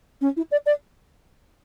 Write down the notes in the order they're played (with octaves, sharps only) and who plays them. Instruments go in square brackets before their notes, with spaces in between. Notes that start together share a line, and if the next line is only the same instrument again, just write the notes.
[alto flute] C#4
E4
D5
D5